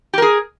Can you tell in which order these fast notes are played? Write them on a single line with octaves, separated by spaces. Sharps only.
G4 A#4 G#4